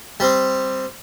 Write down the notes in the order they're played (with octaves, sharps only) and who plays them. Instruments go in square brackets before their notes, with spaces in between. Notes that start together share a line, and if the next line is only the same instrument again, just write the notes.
[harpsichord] G3 C4